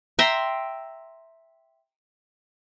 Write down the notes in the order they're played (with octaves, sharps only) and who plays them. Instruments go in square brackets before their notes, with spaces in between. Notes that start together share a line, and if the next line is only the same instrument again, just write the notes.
[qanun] E5 G5 A#5 C6